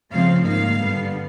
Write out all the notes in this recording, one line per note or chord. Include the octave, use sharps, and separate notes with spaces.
C#3 F3 A3 C4 F5
G#2 D#3 G3 A#3 F5
G2 D3 G3 B3